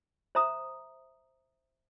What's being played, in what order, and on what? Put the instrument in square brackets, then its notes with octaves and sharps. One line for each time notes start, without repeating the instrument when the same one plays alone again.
[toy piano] C5 E5 A#5 D#6